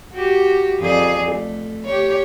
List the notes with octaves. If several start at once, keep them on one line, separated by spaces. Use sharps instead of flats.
F#4 G4
F2 G#4 D5
A3
G4 C#5